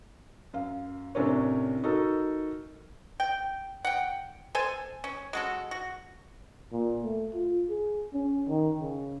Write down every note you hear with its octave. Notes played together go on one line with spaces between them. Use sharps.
F#2 F5
A2 C3 C#4 D4 A#4 C#5
D#4 F#4 A4 A#4
G5
F#5 G5
A4 C5 G#5
C#4
G#3 F#4 A4
F#4
A#2
A3
F4
G#4
C#4
D#3
C#3